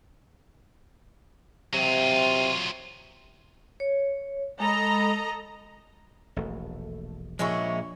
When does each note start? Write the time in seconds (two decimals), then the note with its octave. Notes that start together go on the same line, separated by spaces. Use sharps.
1.74 C3 F#3 F4 D#7
3.80 C#5
4.60 G#3 A4 D#5 A#5 B5
6.36 E1 A#1 A3
7.39 A#1 A#2 F3 G#3 C#4 E4 C#6